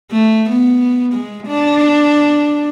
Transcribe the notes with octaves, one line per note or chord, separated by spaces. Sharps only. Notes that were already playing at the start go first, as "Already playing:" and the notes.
A3
B3
G#3
D4